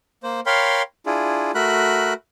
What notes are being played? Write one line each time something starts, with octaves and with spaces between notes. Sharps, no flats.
A#3 C5
A#4 C#5 F5 G5 B5 C6
D4 E4 F4 G#4
A3 F#4 A#4 B5 F#6